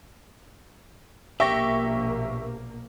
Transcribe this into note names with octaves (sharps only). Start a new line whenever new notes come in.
A#1 B2 A#3 G4 E5 C#6 A#6